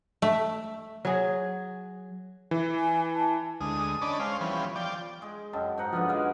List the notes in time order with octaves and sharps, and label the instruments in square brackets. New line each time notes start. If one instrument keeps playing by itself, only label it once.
[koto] A3
[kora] F#3 G#4
[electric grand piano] E3
[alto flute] G#5
A5
[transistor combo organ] D2 G#3 D#6
C#4 D4 D5 D#5 A5 B5
G#3 C#4 C5 F5
E3 F3 G3 B3 C#4
F3 D5 G5
[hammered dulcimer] G#3
[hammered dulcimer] F#2 [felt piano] D#5 G5 A5
[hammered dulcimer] G#2 D#4 F#5
[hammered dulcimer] F#2 D3 B3 [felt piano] F3 F6
[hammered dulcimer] G#3 G#4 F5 [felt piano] D#5